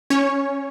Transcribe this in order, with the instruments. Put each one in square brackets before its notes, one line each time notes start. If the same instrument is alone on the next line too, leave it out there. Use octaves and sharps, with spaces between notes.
[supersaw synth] C#4 C#5